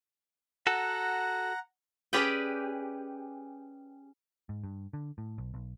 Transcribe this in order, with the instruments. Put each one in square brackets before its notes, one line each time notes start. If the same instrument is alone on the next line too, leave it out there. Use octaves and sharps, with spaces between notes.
[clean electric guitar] F#4 A4 [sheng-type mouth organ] F#5 A#5
[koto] C#4 G4 G#4 B4 D5 G5
[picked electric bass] G#2
G2
D3
A2
B1
B1